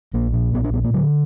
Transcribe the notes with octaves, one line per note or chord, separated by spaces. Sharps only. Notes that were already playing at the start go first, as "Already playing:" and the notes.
A#1 A#3
A#2
A#1 B3
D4
A#2 B3
A#3
D3 F#3